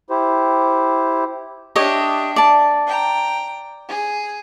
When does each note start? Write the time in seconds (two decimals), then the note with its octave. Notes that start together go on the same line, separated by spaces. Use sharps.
0.10 E4 G4 C5
1.76 D4 G4 C#5 D#5 E5
2.36 D5 A5
2.86 G5 A#5
3.88 G#4